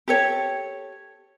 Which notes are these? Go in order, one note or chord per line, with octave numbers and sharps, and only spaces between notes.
G4 A4 C#5